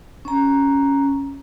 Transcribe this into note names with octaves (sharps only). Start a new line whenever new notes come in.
C#4 A#5